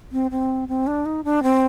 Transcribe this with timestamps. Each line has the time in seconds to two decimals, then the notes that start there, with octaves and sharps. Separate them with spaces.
0.12 C4
0.31 C4
0.68 C4
0.87 D4
1.06 D#4
1.24 D4
1.43 C4